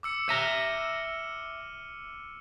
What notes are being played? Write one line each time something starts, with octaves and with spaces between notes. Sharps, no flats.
D6 E6 C#7
E5 A#5 F6 D#7